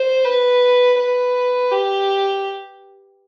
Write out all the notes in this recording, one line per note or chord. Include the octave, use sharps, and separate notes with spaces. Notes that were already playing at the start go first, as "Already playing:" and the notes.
Already playing: C5
B4
B4
G4